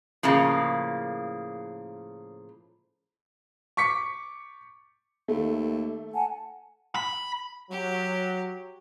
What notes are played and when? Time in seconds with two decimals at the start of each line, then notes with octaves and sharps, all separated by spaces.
0.23 A2 C#3 F3 A#3
3.77 C#6 D6 B6 C#7
5.28 D#2 A3
6.14 F#5 G#5 A5
6.95 B5
7.71 F#3 G4